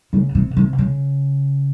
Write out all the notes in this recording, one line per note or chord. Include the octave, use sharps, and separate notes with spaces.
C#3
C3
C3
C#3